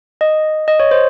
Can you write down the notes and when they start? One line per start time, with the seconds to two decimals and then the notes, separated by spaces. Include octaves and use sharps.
0.21 D#5
0.68 D#5
0.80 C#5
0.91 C5